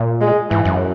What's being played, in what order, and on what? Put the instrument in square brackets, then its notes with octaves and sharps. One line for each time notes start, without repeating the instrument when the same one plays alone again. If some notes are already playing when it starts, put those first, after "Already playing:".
Already playing: [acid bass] A#2
[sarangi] G#3
[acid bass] G#2 [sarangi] E3
[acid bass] F#2